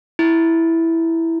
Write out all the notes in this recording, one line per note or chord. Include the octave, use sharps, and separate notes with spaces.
E4